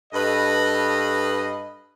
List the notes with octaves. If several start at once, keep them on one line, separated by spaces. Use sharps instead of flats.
G2 A4 B4 D#5